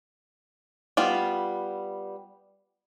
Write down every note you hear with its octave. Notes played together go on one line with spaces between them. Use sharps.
G3 B3 F4